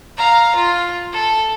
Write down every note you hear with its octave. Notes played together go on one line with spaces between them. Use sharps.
F5 A#5
F4
A4